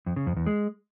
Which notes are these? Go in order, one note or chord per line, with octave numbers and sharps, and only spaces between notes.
F2
C#3
F2
E2
G#3